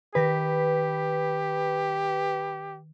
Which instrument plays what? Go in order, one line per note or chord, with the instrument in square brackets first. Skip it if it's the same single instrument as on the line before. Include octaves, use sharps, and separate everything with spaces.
[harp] D#3 A#6 B6 [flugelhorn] G4 [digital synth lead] B4